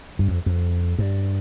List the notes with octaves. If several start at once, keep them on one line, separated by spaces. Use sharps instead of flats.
G2
F2
F2
G2